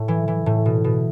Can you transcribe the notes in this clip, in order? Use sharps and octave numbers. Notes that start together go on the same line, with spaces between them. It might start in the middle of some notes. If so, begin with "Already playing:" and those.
Already playing: A2
E3
E3
A2
B2
B2